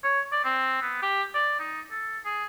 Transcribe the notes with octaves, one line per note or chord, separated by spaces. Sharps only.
C#5
D5
C4
B3
G4
D5
D#4
A4
G#4